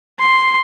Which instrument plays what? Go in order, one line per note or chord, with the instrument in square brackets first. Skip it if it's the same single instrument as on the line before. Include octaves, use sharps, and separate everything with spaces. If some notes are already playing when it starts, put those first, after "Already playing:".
[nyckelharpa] C6